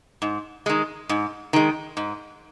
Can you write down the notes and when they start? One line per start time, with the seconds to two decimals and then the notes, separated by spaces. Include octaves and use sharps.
0.22 G#2
0.66 D#3 G#3
1.09 G#2
1.53 D#3 G#3
1.97 G#2